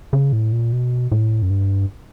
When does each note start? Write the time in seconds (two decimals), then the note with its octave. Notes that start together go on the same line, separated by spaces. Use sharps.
0.13 C#3
0.33 A2
0.52 A#2
0.72 B2
1.11 A2
1.42 F#2
1.50 G2